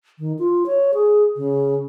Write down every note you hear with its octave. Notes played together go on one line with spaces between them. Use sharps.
D#3
F4
C#5
G#4
C#3